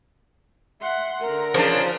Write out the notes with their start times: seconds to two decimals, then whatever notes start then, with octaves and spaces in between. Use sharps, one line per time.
0.81 E5 F#5 C6
1.21 D3 A#4 A#5
1.54 C#3 F3 D4 C5